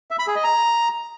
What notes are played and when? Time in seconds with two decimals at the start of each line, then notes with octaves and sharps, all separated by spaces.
0.11 E5
0.19 B5
0.27 G#4
0.36 D#5
0.44 A#5